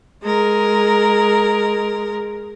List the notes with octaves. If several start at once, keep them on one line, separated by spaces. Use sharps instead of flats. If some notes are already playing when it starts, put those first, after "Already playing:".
G#3 A#4